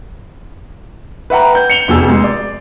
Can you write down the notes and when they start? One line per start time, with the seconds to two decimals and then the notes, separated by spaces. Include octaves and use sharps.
1.30 B4 E5 F#5 G5 A#5
1.55 G6
1.70 C#7 F7 G7
1.88 F1 F2 B2 G#4 E6
2.09 G#3
2.24 D5